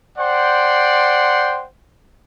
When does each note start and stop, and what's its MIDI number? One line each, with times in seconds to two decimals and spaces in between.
0.18 1.65 72
0.18 1.65 74
0.18 1.65 78
0.18 1.65 79
0.18 1.65 84